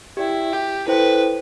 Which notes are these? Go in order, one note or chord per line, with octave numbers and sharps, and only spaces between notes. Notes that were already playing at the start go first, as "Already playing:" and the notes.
E4 G4 D5 G5
G4
E4 A4 B4 C5 G5